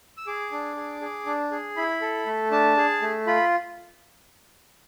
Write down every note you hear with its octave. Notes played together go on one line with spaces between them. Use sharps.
E6
G#4 D6
D4
G#4
G#4
D4
G#4
E4 B5
A4
A3
D4 A5
G#4
A3
F4 B5